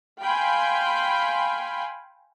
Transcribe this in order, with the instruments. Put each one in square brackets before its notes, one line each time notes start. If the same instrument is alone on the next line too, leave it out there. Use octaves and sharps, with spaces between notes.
[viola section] F5 G5 G#5 B5 C6